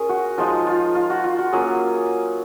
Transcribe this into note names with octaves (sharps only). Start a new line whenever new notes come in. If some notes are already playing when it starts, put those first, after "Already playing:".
Already playing: C#4 G#4 A#4 C5
F#4
F3 G#3 D#4 F4
F4
F4
F#4
F4
F#4
F#3 A#3 C#4 F4 G#4